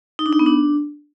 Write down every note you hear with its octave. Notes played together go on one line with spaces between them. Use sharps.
D#4
D4
D#4
B3
D4